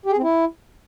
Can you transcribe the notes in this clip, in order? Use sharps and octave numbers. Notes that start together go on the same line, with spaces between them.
G4
G#4
C4
E4